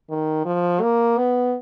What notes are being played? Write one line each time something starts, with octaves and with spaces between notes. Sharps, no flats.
D#3
F3
A#3
B3